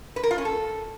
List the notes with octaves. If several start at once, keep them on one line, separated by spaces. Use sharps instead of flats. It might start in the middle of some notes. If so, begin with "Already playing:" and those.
B4
A#4
F4
C#4
A4